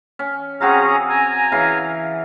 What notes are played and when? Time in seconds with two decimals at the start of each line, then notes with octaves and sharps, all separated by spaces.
0.19 C#4
0.61 C4 C#4 F#4 G#4 F5 A#5
1.09 G#5 A#5
1.52 C#3 E3 F5